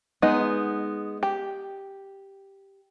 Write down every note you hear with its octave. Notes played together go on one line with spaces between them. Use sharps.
G#3 B3 D#4
G4